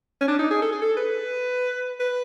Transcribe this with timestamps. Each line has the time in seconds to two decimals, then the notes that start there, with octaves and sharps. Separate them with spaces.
0.21 C#4
0.28 D4
0.39 D#4
0.51 G#4
0.62 A4
0.72 G#4
0.82 A4
0.97 B4
2.00 B4